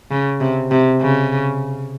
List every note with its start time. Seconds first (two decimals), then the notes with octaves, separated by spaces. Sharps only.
0.11 C#3
0.41 C3
0.71 C3
1.01 C#3